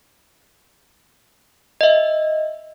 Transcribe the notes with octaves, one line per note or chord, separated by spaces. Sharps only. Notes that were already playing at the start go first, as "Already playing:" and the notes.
D#5 E5